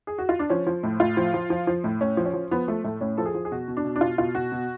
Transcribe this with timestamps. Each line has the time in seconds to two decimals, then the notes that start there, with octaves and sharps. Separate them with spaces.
0.07 G#4
0.18 F#4
0.29 F4
0.39 D4
0.50 F3 C#4
0.67 F3
0.83 A2
1.00 A2 F4
1.17 F3
1.34 F3
1.50 F3
1.67 F3
1.84 A2
2.01 A2 C#4
2.17 F3
2.25 C#4
2.33 F3
2.51 F3 B3
2.68 F3 A3
2.84 A2 A3
3.01 A2 C#4
3.17 F3 A4
3.26 G#4
3.34 F3
3.45 G#4
3.51 B2 F#4
3.68 B2
3.77 D4
3.85 B2
3.96 D4
4.01 B2 F4
4.18 B2 F4
4.35 B2 F#4
4.52 B2